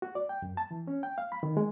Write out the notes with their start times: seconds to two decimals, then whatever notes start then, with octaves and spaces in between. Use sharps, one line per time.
0.02 F#4
0.15 D5
0.29 G5
0.42 F#2
0.57 A5
0.71 E3
0.87 C#4
1.03 G5
1.18 F5
1.32 B5
1.43 D#3
1.57 G#3